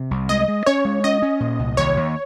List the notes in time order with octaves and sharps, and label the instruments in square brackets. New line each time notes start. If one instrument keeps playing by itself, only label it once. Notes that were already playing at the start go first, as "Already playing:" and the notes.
Already playing: [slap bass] C3
C2
[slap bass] G#3 [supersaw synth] D#5
[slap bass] G#3
[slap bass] C#4 [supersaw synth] C#5
[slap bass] G#3
[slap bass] C#4 [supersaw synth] D#5
[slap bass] C#4
A#2
C2
[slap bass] D#2 [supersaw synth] C#5
[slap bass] D#2